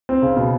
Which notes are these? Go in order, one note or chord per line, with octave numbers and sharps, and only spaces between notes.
C4
C#3
B2